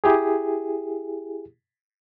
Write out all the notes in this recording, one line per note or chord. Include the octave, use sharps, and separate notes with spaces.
E4 G4 G#4